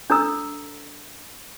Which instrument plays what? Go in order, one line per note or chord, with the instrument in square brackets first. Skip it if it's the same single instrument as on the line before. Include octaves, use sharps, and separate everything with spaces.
[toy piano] D4 A4 A#5 E6